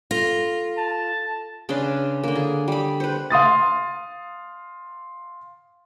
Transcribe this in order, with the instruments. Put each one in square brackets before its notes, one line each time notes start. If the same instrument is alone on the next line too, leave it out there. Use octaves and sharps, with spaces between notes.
[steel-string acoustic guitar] F4 [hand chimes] A4 A#6
[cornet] A5
[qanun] C#3 D4 B4 C6
D3 A#3
G#4
G3 B5
B4 C5
[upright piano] F5 C6 D#6 A6